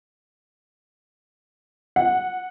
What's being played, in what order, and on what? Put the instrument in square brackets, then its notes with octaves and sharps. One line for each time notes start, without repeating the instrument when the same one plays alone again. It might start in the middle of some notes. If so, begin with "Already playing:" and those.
[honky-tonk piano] F#5